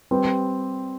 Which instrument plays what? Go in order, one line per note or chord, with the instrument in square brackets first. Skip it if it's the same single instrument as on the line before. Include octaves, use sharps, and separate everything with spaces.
[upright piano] G3 C4 G4 B4